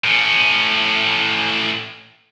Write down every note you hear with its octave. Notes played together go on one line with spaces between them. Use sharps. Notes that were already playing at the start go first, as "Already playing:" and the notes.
A2 C#4